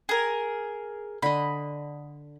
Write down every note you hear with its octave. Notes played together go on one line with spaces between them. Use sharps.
G#4 A#4
D3 D#5 B5